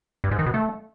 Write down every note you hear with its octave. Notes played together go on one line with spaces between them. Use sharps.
G2
G#2
D#3
B2
A3